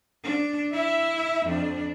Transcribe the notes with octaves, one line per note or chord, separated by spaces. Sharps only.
D4
E4 E5
F2 D4